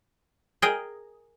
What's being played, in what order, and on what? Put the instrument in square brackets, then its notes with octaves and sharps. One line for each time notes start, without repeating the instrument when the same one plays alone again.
[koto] G#4 A#4 D#5 G5